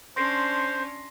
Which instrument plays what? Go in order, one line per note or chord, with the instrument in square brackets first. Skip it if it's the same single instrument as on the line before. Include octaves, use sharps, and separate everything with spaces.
[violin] C#4 D4 [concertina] C5 [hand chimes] C6 A#6 C7